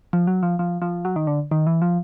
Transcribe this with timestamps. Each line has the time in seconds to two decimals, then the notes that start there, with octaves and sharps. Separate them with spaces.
0.13 F3
0.27 F#3
0.43 F3
0.59 F3
0.82 F3
1.05 F#3
1.16 D#3
1.27 D3
1.51 D#3
1.67 E3
1.82 F3